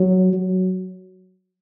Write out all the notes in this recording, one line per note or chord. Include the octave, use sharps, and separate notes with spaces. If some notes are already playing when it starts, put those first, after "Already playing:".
Already playing: F#3
F#3